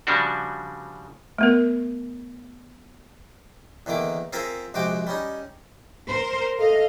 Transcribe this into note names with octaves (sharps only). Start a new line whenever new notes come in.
C#3 F3 G3 D4 F#4
A3 B3 A#4
E2 D3 D#3 A#3 D6
C4 F4 G#4 A#4 E5 F5
A#1 C3 G#3 F#4 G5 D6
G3 C#4 D#4
A#4 C5
A4 D#5 F5